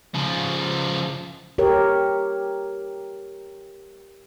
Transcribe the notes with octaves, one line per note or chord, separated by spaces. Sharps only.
C#3 F3
G4 A#4 C#5